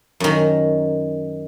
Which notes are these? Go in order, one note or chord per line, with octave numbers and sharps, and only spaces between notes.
F#2 D#3